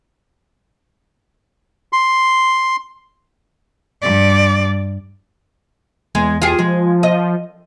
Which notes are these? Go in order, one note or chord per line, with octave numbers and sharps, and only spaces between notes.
C6
G2 D5
E2 G#3
F4 G4 G#4
F3 G#3
D#5